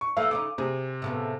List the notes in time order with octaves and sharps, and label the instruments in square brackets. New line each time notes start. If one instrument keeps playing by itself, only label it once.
[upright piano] C#6
[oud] E3 A3 A#3 [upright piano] F5
[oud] C#3 C#4 D#4 [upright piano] D6
[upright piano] C3 [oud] G#4
[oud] A2 C#3 B3